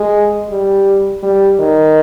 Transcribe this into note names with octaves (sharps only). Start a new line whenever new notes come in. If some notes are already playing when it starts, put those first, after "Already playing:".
Already playing: G#3
G3
G3
D#3